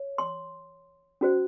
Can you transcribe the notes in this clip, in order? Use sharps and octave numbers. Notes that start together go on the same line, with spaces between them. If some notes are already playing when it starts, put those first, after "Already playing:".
Already playing: C#5
C6
C#4 F#4 C5